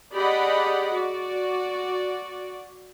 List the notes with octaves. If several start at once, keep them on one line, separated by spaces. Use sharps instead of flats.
G4 G#4 D5 D#5 F#5 B5
F#4 D5